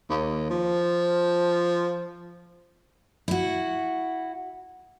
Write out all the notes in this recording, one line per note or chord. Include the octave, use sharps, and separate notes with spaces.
D#2
F3
E4 F#4